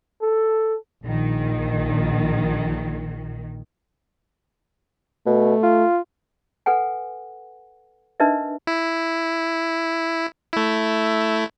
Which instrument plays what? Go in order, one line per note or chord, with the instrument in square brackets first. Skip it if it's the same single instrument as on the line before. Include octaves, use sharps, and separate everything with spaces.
[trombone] A4
[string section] A#1 D#3
[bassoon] B2 [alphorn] A3
[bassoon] F4
[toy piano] A4 B4 F#5 G#5
D4 D#4 A#4 B4 D#5 E5
[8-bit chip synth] E4
A3 E4